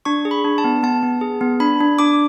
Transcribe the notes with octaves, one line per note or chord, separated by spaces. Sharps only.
D4 C#6
G#4
B5
D4
A5
B3
B3 A5
B3
G#4
B3
D4 B5
D4
D4 D6